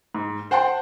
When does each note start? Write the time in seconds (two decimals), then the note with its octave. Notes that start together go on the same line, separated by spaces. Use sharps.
0.15 G#2
0.51 C5 F#5 G5 A5 C6